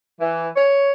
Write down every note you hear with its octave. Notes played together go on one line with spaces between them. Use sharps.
E3
C#5